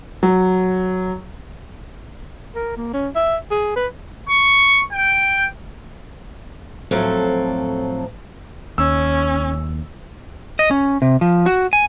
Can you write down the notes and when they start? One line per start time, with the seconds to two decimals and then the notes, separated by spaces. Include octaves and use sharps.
0.23 F#3
2.55 A#4
2.77 A#3
2.94 C#4
3.15 E5
3.51 G#4
3.76 B4
4.29 C#6
4.92 G5
6.91 A2 F3 F#3 C4 A4
8.78 D#2 C#4 E6
10.59 D#5
10.71 C#4
11.02 C3
11.21 F3
11.46 F#4
11.73 G#5